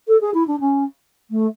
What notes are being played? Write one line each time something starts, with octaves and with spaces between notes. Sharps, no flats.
A4
G#4
E4
D4
C#4
A3